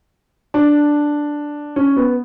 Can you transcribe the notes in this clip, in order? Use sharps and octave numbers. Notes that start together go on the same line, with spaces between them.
D4
C#4
B3